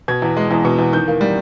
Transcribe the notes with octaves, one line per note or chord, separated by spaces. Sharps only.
B2 G#6
E2
G#3
E2
B2
E2
D#3 G6
A#3
G3